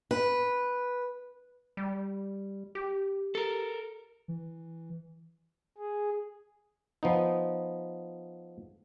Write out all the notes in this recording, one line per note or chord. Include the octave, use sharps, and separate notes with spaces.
B4
G3
G4
A4 A#4
E3
G#4
F3 B3 D#4